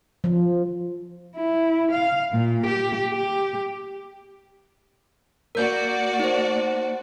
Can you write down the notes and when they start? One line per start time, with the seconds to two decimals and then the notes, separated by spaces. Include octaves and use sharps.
0.24 F3
1.36 E4
1.92 F5
2.32 A#2
2.66 G4
3.12 G4
5.55 A#3 F#4 A#4 D5 G6
6.19 D#4 C5